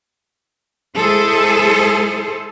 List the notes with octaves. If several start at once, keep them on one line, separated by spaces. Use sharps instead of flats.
G#3 E4 G#4 A4 C5